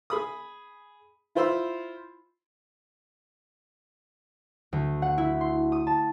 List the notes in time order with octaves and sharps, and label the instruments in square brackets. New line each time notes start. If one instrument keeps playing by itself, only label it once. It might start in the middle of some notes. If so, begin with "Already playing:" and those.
[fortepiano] G#4 B5 D#6
E4 F4 C5 B5 C6 E6
[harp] D2
F#5
E4
C6
D#6
A5